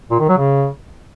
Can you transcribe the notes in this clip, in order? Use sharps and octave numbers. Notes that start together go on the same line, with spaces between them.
A#2
D#3
F#3
C#3